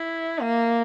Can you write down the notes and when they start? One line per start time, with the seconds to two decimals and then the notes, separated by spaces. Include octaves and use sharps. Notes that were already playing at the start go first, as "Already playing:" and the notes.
Already playing: E4
0.41 A#3